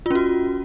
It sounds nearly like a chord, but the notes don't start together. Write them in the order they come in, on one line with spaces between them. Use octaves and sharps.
F4 C#4 F#4